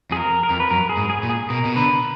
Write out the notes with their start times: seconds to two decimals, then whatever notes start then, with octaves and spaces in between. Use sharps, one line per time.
0.11 F2 G#4
0.17 A#4
0.43 A#4
0.50 F2
0.60 B4
0.70 F#2 A#4
0.89 G#4
0.97 G#2
1.10 G#4
1.23 A#2
1.30 G#4
1.50 B2 A#4
1.65 B2
1.76 D3 B4